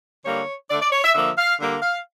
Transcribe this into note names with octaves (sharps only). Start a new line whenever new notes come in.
D3 G3 A#3 C#5
D3 A3 D5
D5
C#5
E5
D3 F3 A#3 E5
F5
D3 G3 A#3
F5